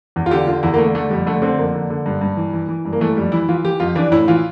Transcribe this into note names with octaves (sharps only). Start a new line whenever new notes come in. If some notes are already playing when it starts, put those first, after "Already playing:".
E2
F4
D3 G4
D3 F4
E2 E4
A#3
D3 A3
D3 A3
F2 G3
D3 A3
D3 C4
F2 A#3
D3
D3
G2
G2
E3
E3
E3
G2
A#3
E3 A3
F2 G3
E3 E4
E3 F4
E3 G4
F2 F4
E3 D4
A2 E4
E3 F4